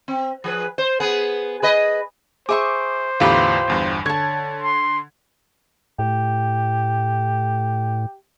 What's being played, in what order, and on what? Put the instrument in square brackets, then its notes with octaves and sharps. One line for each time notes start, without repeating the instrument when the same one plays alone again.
[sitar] C4
F3 G#4 B4
C5
B3 G#4 B4
G#4 B4 D#5
[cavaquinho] G#4 E5 C#6 [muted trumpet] C5 [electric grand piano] D6
[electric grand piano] E2 A2 D3 [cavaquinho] F4 G4 B4
[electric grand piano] G1 E2 G2
[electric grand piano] D3 G#6 [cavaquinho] C#5 A5
[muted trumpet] C6
[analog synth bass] A2 [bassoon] G4